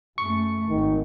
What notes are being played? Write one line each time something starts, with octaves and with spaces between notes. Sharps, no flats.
F#2 A3 C#6
G#1 D#3